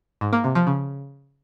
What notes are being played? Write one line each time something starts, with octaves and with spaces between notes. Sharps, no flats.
G#2
A#3
C3
F3
C#3